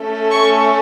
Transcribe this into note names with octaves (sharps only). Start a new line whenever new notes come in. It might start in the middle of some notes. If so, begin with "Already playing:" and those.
Already playing: A3 C#4 A4
C#6